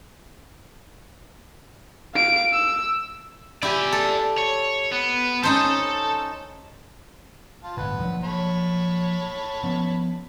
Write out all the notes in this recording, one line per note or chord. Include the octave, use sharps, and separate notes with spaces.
F5 D7
E6
E4 G4 D5 G#5
A4
C#5
B3
C#4 D#4 A4 C5
F4 A5
G1 A2 B4 F#5
A#1 F3 F#3
C#5 A5 B5
F3 B3 C#4